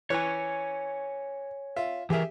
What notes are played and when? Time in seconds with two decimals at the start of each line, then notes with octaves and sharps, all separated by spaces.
0.10 E3 C#5 G#5 F#6
1.76 F4 E5
2.10 E3 G4 G#4 A#4 E5